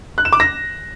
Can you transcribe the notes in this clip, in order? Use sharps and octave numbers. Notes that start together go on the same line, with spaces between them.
F#6
E7
D6
A#6